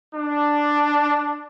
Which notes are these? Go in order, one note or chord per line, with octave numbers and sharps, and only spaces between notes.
D4